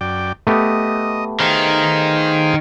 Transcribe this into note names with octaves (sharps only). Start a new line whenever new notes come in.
F#2 D5 G5
A3 B3 G4 D#5
D#3 G#4 C5 F5